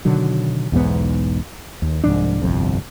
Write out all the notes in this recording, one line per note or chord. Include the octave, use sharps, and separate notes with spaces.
B2 D3 D#3 F#3
B1 E2 G#2 B3
D#2
C2 G#2 F3 D4
G1 C2 F2